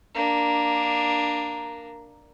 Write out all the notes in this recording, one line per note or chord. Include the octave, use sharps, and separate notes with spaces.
A#3 D4